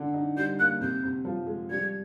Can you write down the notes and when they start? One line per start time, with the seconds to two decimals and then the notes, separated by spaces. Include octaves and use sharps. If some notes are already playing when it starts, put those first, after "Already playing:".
Already playing: D3
0.14 D#4
0.36 G3 G6
0.59 A#3 F#6
0.80 C3 G6
1.03 C3
1.25 F3
1.47 G#3
1.70 G3 G#6